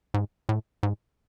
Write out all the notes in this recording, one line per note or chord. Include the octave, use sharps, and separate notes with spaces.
G#2
A2
G#2